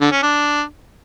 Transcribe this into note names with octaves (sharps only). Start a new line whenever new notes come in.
D3
C#4
D4